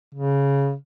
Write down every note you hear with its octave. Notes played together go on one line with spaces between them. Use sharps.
C#3